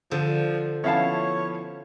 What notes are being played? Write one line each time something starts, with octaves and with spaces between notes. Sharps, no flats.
D3 F3
F3 B3 C#4 E4 C#5 F5 A5